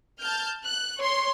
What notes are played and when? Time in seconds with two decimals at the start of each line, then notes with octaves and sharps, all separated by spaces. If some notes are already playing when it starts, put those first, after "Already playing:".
0.22 A5 F6 G6
0.64 F#6
0.98 C#5 C6